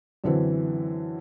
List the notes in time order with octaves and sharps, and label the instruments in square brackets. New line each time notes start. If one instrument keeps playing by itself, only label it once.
[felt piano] F#2 D3 E3 C4